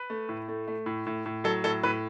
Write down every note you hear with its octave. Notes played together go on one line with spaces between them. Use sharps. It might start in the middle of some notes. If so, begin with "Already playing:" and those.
Already playing: B4
A3
A2
A3
A3
A2
A2
A2
F#3 A4
A2 A4
A2 B4